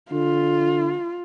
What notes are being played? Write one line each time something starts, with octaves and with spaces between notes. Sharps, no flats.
D3 F4